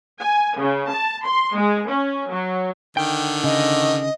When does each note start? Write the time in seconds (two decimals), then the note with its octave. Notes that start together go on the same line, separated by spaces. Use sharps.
0.20 G#5
0.58 C#3
0.91 A5
1.26 C6
1.57 G#3
1.90 C#4
2.32 F#3
2.97 D3 D#3 G5
3.44 C#3 D#5